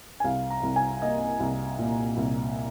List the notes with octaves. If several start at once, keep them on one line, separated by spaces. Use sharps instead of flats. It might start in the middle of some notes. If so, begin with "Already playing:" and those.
G#5
C2 F5
A#5
C2
G#5
A#3 D#5
C2
A#2
C2